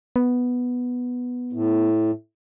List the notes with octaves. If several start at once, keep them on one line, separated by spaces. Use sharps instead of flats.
B3
A2